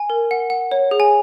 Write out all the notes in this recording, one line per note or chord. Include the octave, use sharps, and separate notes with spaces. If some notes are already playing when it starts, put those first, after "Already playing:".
Already playing: G#5
A#4
F#5
F#5
C#5
G#4
G#5